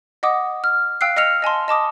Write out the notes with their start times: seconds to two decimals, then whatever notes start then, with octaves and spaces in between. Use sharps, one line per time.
0.23 D#5 F#5 D6 D#6
0.64 F6
1.01 F5 G5 E6 F#6 C7
1.17 D#5 E6 F6 C#7 F7
1.42 D#5 G#5 A5 C6
1.68 D#5 A5 D6 D#6